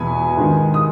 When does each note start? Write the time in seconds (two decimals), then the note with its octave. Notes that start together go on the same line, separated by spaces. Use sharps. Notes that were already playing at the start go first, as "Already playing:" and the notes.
Already playing: E2 B2 G#5 B5
0.37 G#2 D#3
0.74 D#6